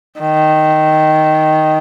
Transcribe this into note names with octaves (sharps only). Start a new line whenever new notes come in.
D#3